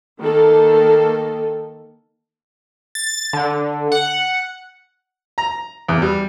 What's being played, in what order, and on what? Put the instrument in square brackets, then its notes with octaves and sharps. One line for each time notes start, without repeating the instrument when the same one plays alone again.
[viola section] D#3 A#3 A4
[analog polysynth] A6
D3
F#5
[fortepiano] A#5
E2
G3